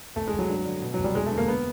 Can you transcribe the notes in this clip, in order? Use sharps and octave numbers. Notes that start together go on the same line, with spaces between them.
F1 A3
G#3
F1
F#3
G2
D3
B2
F#3
F1
G3
E1 G#3
A3
D2
A#3
B3